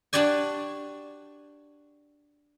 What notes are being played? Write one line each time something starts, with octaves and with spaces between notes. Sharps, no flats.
D4 F#4 G4 D5 G#5